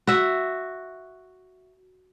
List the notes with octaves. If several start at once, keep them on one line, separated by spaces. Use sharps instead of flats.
F#4 E5